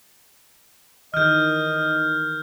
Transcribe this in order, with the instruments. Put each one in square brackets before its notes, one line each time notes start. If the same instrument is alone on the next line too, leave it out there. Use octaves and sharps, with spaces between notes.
[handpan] D#3 E3 [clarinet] D#5 [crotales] F6 G6